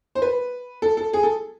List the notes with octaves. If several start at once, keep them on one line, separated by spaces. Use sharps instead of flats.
C5
B4
A4
A4
G#4
A4